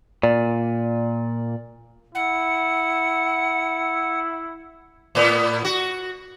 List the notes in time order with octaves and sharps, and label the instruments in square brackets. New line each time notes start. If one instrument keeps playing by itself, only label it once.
[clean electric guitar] A#2 [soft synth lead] D5
[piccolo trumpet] E4 [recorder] F#5
[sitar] A2 B3
F#4